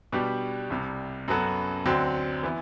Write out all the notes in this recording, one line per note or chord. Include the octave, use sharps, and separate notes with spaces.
B2 G3 D4 G4
C2 C3 G3
F#2 F#3 B3 F#4 A4
D2 D3 F#3 C4
E3 B3 E4